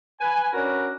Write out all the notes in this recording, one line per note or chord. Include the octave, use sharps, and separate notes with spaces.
B4 G#5
C#4 D4 F#4 A#4 B4